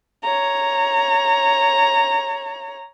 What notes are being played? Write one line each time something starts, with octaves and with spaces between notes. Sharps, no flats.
C#5 A#5